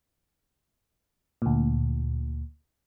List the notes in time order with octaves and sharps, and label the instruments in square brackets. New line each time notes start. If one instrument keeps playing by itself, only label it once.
[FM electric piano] D2 A#2